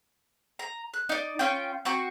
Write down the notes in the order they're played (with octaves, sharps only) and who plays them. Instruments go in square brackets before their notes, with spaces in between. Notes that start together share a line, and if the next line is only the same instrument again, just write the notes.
[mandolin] A#5
F#6
D#4 D5
C#4 F4 G5
C4 F#4 C#6